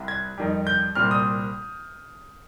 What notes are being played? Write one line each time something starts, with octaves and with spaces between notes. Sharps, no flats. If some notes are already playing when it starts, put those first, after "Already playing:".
Already playing: C2 C3 G3
G#6
F2 D#3 G3
G6
C2 A#2 G3 C4 F6
D#6